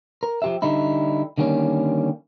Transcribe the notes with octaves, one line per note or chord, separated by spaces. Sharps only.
A#4
F3 G4 E5
D3 G3 D#4 E4
D3 D#3 G3 A#3 C#4